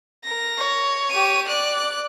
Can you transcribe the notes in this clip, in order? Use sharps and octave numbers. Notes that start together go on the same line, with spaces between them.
A#4 A#6
C#5
G4 D#7
D5 F#6